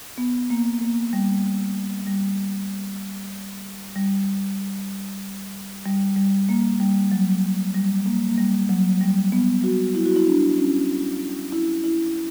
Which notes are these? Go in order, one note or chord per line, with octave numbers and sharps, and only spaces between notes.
B3
A#3
A#3
G3
G3
G3
G3
G3
A#3
G3
F#3
G3
A#3
A#3
G3
F#3
G3
B3
F#4
E4
F#4
E4
D4
C#4
E4
E4